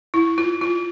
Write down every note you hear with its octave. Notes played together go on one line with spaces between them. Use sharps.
E4
F4
F4